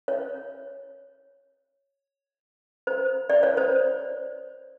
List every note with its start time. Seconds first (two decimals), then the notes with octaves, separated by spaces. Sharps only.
0.08 C#5
2.87 C5
3.30 D5
3.43 C#5
3.57 C5